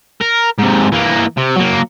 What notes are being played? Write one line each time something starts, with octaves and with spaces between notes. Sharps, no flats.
A#4
G#2 C3
E3 A#3
C3
F#3 A#3